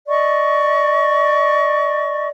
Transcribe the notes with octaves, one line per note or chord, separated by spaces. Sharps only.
D5 D#5 C#6